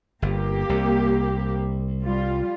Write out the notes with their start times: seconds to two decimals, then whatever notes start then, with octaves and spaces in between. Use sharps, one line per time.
0.22 G1 A#3 G4
0.69 C2
2.03 G3 F4